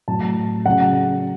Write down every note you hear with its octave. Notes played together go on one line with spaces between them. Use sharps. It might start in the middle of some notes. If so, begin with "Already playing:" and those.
A2 F#3 A5
C#3 F#3 F#5